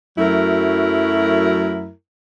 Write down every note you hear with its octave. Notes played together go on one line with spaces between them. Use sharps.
F#2 F#3 A3 E4 A#4